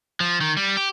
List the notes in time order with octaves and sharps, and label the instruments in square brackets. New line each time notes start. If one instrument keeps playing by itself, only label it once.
[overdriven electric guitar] F3
D#3
G3
G4